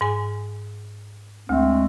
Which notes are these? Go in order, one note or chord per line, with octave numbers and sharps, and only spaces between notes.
G#2 G#5
D2 G#3 A3 C4